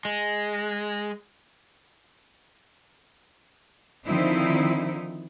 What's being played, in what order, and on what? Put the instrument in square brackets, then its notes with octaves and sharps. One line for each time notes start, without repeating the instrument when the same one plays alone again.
[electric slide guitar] G#3
[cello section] D3 D#3 F3 C4 D#4 E4